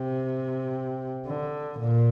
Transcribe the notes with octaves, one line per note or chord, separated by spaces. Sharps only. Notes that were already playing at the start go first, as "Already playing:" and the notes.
Already playing: C3
D3
A#2